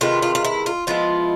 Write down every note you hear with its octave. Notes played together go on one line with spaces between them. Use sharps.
C3 D#3 G#3 B3 F4
F4
F4
E4
F4
F3 G#3 B3 E4 F4